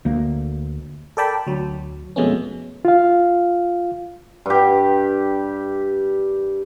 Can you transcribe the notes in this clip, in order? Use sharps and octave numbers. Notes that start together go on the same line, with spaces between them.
D2 A#3
A4 A#4 D5 G5 A5 B5
D2 F#3
F2 B2 G#3 A3 B3 C#4
F4 F5
G2 G4